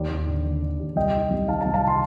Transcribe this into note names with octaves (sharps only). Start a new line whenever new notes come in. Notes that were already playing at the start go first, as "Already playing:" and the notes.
Already playing: D#2 D5
D#2
D3
D3
D3
D#2
C2 D#5 G5
D#3
C2
D#3 F5 A5
F5 A5
C2
F5 A5
C3
A5 C6